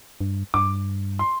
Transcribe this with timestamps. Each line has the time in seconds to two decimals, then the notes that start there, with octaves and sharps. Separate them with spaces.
0.21 G2
0.54 G2 D6
1.19 C6